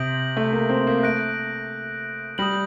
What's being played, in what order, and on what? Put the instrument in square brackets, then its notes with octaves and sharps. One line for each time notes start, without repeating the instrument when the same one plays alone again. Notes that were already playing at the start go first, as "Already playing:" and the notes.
Already playing: [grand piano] C3 [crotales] D#6 G6 A#6 D7 F#7
[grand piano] A3
A#3
C4
A#3
[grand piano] A3 [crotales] F#6 A#6 D7
[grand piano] G3 [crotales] D#6 G6 A#6 F#7